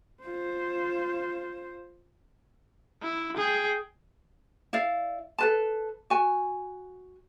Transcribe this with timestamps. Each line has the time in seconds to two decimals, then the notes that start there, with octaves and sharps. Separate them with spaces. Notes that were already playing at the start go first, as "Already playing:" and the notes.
0.23 F4 C5
3.02 E4
3.37 G#4 G5
4.73 E4 D5 F5
5.38 A4 B4 A5
6.10 F#4 G#5